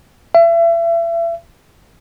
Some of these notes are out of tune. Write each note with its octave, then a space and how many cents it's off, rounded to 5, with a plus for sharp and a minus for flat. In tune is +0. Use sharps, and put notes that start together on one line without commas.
E5 +35